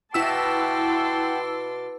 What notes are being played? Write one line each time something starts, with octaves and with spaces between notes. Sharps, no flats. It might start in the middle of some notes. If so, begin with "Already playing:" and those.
B2 E4 F#5 G5 A5 C6 D6 E6